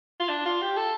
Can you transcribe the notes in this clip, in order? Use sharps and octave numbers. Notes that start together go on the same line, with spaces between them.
F4
D4
F4
G4
A4